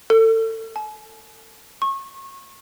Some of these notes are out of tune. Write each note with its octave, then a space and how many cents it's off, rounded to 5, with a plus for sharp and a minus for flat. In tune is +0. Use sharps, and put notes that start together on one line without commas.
A4 +30
G#5 +45
C#6 -30